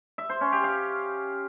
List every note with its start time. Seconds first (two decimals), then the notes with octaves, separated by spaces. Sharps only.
0.18 E5
0.30 C5
0.41 C#4
0.52 G4
0.64 F5